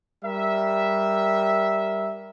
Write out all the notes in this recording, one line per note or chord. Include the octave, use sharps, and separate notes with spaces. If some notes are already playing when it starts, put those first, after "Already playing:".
G3 A#4 E5